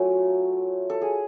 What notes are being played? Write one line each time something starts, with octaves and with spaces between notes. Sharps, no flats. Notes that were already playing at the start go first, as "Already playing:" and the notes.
Already playing: F#3 A3 C#4 F4
A4
G#4